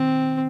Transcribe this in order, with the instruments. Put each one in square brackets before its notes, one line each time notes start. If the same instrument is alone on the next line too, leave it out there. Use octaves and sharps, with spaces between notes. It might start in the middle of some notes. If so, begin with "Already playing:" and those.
Already playing: [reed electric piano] D#3 [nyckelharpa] C4